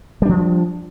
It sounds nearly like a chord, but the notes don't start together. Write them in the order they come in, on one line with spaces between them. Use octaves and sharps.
G3 D4 F3